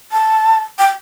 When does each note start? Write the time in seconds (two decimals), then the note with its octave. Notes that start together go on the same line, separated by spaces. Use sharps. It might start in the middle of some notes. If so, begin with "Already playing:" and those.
0.12 A5
0.79 G5